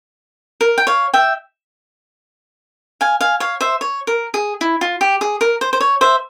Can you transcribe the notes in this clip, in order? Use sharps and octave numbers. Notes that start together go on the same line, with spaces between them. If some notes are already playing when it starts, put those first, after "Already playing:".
A#4
G5
C#5 F5
E5 G5
F5 G#5
F5 G#5
C#5 F5
C5 E5
C#5
A#4
G#4
E4
F4
G4
G#4
A#4
C5
C5
C#5
C5 E5